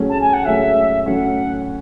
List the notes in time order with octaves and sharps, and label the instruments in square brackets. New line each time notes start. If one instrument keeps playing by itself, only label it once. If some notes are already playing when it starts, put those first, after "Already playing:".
Already playing: [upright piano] A2 F#3 A3 C#4 G#4
[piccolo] A5
G#5
F#5
[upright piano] A2 F#3 A3 C#4 G#4 [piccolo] E5
[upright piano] A2 F#3 A3 C#4 [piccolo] F#5